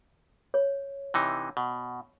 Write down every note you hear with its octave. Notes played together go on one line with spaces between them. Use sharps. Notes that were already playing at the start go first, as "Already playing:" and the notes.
C#5
C3 E3 D#4
B2